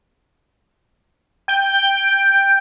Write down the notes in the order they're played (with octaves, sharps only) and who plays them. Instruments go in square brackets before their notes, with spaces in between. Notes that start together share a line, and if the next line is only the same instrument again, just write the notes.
[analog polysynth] G5